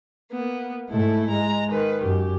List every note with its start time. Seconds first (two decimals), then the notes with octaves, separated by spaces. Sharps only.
0.32 A#3 B3
0.90 G#2 A3 E4 A4
1.30 G#3 A#5
1.70 D#3 B4
2.02 F#2 G4